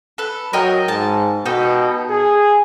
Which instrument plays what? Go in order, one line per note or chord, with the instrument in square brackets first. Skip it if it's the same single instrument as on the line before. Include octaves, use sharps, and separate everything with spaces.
[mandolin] A4 B4
[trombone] F#3 [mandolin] A#4 D#5 G5
[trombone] G#2 [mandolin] A5
[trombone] B2 [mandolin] D#4 G4 A4
[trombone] G#4